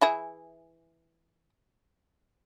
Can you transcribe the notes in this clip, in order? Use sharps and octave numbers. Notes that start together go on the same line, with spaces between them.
E3 E4 G#4